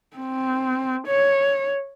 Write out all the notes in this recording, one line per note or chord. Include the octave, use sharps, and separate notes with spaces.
C4
C#5